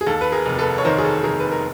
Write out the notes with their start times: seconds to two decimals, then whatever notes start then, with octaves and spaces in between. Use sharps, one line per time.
0.01 G#4
0.06 D#2 A4
0.21 B4
0.32 G#4 A#4
0.46 F1
0.59 A4 B4
0.78 C#5
0.85 D#3 A#4 C5
0.98 G#4
1.05 A4
1.23 F1 G#4 A#4
1.40 B4
1.51 A#4